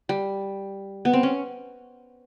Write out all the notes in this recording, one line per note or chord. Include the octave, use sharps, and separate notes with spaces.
G3
B3
C4
C#4